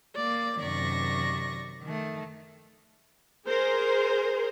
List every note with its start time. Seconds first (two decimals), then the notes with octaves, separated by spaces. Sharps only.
0.15 A#3 D5
0.62 F#2 C3 D#3 D5 C#6 A#6
1.83 D#3 A3
3.47 G#4 A#4 C5